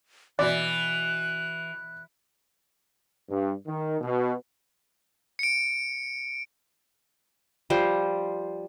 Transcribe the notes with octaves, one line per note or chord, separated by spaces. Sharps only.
B2 E3 D5 F#6
G2
D#3
B2
C#7 D7
F3 G3 C5